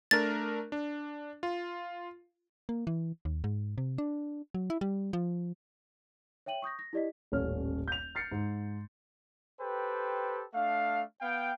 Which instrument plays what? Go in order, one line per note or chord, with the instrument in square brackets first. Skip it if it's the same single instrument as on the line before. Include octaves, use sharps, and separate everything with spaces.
[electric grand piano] A3 D4 A#4 [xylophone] A6
[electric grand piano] D4
F4
[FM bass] A#3
E3
D#2
G#2
C3
D4
F#3
E4
G3
F3
[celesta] C#5 E5 G5 D#7 F#7
C#6 D#6 G6 A#6
A#6
E4 G4 D5 D#5 B6
[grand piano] D#1 A1 A3 C#5 F6
G6 F7
F6 A6 C7 C#7
G#2
[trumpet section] G4 A4 B4 C5 G5
A3 D4 F5
B3 F5 G5